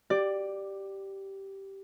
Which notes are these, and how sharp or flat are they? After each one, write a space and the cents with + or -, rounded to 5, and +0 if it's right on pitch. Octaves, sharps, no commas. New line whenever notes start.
G4 -10 D5 +10